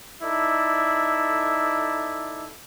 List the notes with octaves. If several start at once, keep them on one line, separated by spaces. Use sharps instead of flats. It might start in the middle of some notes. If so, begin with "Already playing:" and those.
D#4 E4 A4 D5